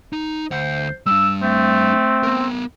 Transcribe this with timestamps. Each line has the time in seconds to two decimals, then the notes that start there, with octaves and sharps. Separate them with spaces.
0.13 D#4
0.51 D2 C5 F#5
1.07 G3 D4 E6
1.43 A3 C4
2.23 B3 A#4